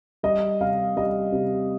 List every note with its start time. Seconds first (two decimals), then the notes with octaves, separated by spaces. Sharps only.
0.23 G3 D#5
0.60 C3 F5
0.97 G3 D#5
1.32 C3